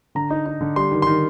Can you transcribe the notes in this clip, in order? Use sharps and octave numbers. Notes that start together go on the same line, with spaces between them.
D3 A#5
D#4
D#4
D3
G3 C6
D#3
D#3 C6